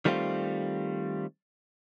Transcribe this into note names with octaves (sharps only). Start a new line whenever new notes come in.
D#3 G3 A3 C4 F4